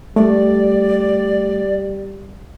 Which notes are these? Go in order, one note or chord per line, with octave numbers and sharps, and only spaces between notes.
G3 A3 D5